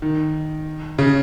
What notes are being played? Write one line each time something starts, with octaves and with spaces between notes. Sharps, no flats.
D#3
C#3